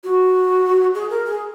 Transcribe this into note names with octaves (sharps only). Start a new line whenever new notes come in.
F#4
G#4
A#4
G#4